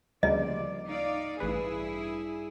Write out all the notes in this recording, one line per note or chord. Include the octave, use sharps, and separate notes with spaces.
D2 C#3 F3 G3 A#3 D5 D#5
D#4 D5 F5
A1 G2 E4 G#4 B4